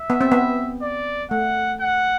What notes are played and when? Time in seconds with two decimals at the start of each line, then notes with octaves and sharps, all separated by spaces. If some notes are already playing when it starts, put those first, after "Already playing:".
Already playing: E5
0.10 B3
0.21 C4
0.32 B3
0.82 D5
1.31 A3 F#5
1.80 F#5